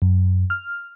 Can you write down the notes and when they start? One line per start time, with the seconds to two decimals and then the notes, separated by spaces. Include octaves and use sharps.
0.02 F#2
0.50 F6